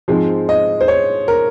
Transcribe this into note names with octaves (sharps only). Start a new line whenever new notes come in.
G#2 F3 G#3 C4
D#5
C5
C#5
A#4